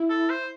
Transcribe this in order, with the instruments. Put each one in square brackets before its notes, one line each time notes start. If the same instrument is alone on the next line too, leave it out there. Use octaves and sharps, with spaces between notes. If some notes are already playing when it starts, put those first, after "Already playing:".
Already playing: [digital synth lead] E4
[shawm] A4
C5